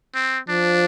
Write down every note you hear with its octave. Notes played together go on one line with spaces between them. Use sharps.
C4
F3 D4